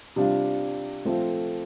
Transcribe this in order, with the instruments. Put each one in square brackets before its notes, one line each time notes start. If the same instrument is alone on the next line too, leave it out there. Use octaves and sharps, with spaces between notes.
[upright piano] C3 G3 D4 F4
F3 A3 C4 F4 A4